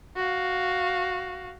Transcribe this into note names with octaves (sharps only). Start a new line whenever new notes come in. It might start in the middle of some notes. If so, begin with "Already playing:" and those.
F#4 F5